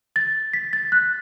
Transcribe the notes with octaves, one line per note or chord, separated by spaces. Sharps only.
A6
B6
A6
F#6